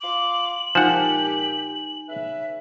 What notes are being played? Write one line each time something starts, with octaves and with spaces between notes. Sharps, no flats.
F4 C6 D6 F#7
A#2 F3 G#3 D#4 G4 F#5 G#5 E7
C#3 B4 E5